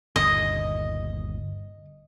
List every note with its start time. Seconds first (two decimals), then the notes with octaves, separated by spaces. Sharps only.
0.16 G1 D#2 A#2 D#5